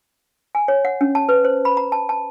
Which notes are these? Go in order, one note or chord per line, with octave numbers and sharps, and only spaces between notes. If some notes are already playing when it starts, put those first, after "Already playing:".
G#5
C#5
F#5
C#4
A5
B4
C5
B5
A#5
A5
A5